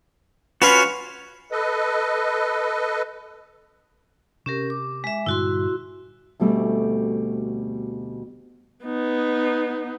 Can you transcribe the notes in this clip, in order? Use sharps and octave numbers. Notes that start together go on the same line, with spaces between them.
C#4 F4 F#4 B4 F5
A4 B4 D#5
C3 C#4 G4 A#4
D6
G#3 E5
G2 A#2 D3 E4 F#4 C6
D2 B2 G3 A3 C4
B3 D#4